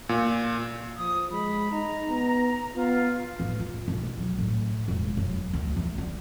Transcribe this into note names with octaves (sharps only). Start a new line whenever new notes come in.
A#2
F3 D#6
G#3 B5
D#4 A#5
B3
B3 F4
A1
F4
B1
F#3
A2
E1
F#2
D2
E3
D3